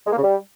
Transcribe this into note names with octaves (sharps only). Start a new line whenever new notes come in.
G#3
A#3
C#3
G3